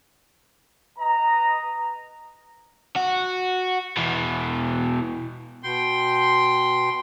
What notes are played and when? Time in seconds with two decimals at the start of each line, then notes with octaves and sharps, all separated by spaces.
0.99 B4 D#5 A#5
2.96 F#4
3.97 B2 E3
5.63 B2 G5 C6